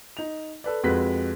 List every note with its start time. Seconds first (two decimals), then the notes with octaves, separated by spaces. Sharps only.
0.17 D#4 F7
0.64 A4 B4 D5
0.83 F2 G#3 C4 F#4 B4 B6